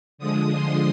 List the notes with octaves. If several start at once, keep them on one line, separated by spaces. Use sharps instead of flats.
D3 F3 G#3 D#6
C6